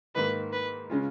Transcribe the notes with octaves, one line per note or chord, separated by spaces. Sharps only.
G#2 D#3 A#3 D#4 B4
B4
C#3 G#3 C#4 F4